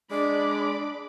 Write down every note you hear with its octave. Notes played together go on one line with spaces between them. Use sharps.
G#3 D4 D5 B5 D6